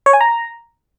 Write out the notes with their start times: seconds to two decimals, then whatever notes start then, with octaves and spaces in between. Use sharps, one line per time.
0.06 C#5
0.13 G#5
0.21 A#5